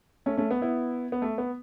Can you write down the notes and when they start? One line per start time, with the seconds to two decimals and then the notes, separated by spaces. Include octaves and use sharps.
0.26 A3 C#4
0.37 A3 C#4
0.51 B3
0.61 B3 E4
1.12 B3
1.22 A3
1.38 B3